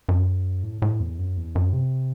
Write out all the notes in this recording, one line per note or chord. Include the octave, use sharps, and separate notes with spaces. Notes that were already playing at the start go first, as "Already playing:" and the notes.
F#2
A2
A2
E2
F#2
E2
F#2
C3